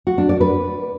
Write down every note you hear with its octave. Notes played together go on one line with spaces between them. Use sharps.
F#4
D4
D5
B4